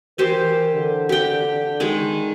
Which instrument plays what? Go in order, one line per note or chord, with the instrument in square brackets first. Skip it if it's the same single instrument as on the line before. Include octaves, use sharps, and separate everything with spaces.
[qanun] E3 G4 C5 [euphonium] A#4
[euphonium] D3
[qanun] G4 G5
D#3 G#3